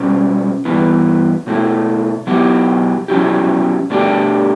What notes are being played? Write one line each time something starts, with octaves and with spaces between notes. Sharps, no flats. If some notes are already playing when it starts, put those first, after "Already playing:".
Already playing: B2 G3 C#4
G2 E3 B3
B2 A3 E4
B2 F#3 B3 E4 G4
B2 F#3 C#4 E4 G4
B2 A3 D4 G4